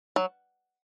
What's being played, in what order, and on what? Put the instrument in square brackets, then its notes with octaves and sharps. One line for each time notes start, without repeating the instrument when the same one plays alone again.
[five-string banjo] F#3